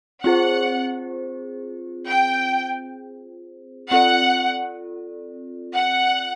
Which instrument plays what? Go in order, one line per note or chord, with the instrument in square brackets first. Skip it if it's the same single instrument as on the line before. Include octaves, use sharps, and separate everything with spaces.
[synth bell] C4 F4 G#4 C5 [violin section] F#5
[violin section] G5
[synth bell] C4 F4 A4 D5 [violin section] F#5
[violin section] F#5